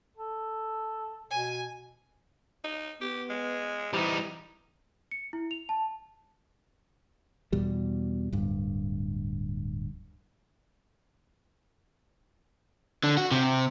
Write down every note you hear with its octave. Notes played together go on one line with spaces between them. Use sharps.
A4
B2 G#5
D#4
B3 G4
G#3
C3 E3 G3 D#4
C#7
E4
F7
A5
E2 B2 G3
D1 G2
D3
F#4
C3